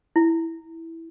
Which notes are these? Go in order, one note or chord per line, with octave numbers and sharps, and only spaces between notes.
E4